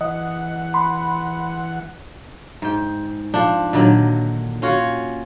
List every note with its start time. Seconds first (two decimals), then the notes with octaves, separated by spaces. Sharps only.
0.01 E3 D#5 F#5
0.74 B5 C6
2.62 G#2 G5
3.34 F3 D4
3.73 A#2 D3 D#3 F#3
4.62 C#4 F4 F#4 C#5